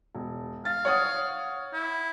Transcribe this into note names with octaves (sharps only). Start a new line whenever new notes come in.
E1
F5 A6
C#5 F#5 D#6
E4